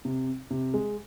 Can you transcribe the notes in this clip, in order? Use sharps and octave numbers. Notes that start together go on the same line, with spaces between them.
C3
C3
G#3